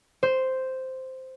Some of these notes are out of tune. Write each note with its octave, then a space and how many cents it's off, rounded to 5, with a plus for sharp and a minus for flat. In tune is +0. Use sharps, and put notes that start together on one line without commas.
C5 -5